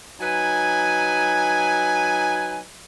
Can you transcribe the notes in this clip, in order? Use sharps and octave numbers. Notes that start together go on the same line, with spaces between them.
F#3 D#4 B4 G#5